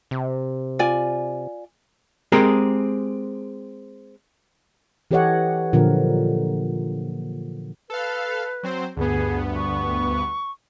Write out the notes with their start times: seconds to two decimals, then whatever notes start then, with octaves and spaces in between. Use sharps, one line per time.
0.11 C3
0.79 F4 D5 G#5
2.32 G#3 C4 G4 G#4 A#4
5.11 E3 G4 A4 C#5 D#5 F#5
5.73 A#2 D3 F3 F#3 A#3 A#4
7.90 A4 B4 F5
8.63 F#3 C4 C5
8.96 D2 G2 B3 G#4
9.56 C#6